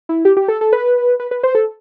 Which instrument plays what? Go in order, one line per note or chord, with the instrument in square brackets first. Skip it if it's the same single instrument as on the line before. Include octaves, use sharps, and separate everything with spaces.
[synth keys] E4
G4
G4
A4
A4
B4
B4
B4
C5
A4